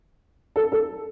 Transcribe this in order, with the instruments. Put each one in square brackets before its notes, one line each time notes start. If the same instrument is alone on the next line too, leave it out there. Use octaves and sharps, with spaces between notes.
[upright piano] A4
A4